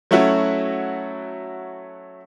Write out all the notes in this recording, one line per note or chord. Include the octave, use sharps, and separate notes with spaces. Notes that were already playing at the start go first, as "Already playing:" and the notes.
F#3 A3 C#4 E4 F#4